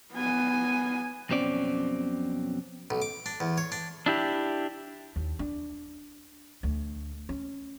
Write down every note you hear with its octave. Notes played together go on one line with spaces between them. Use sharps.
B3 G#5
B1 F2 B2 C4 C#4 D5
B1
D6
D4
E2
C#5
D4
D4 E4 G4
D#2
D4
D2
C#4